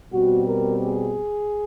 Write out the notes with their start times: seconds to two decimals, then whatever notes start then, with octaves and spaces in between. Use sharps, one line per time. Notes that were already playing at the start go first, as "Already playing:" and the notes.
0.11 B2 G3 C4 F#4
0.45 A#4
0.80 G#4